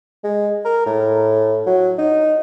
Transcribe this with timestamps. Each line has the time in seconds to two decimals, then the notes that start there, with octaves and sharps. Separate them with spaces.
0.24 G#3
0.65 A#4
0.86 A2
1.66 F#3
1.98 D#4